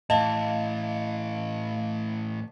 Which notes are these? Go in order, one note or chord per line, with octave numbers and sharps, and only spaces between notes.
A2 E3 D#5 F5 A5